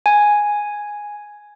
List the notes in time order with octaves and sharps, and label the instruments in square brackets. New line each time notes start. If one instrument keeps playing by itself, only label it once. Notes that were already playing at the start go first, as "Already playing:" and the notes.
[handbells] G#5